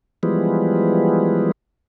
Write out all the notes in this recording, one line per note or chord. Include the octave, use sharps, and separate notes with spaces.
E3 F3 G3 G#3 B3